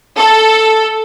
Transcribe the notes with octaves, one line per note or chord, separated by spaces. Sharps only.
A4